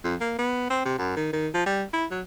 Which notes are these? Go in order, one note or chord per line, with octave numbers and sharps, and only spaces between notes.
F2
A#3
B3
C4
C3
F#2
D#3
D#3
F3
G3
E4
F#3